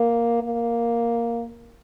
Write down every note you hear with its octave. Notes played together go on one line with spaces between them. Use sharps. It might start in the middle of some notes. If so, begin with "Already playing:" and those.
Already playing: A#3
A#3